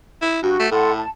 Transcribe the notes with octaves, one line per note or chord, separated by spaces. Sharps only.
E4
G2 F#4
A3
A2 A4 F#5 C6
A5